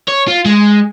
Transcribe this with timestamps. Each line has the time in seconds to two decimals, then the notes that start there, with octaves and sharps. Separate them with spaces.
0.08 C#5
0.28 F4
0.45 G#3